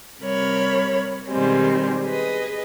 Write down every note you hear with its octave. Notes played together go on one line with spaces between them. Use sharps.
C3 G3 A#4 C#5 B5
B2 D#3 G3 G#3 C4
G#4 B4 D#5